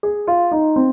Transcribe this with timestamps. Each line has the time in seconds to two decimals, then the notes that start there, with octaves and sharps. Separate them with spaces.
0.03 G#4
0.27 F4
0.52 D#4
0.76 C4